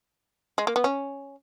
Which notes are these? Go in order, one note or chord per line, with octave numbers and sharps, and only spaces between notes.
G#3
A#3
B3
C#4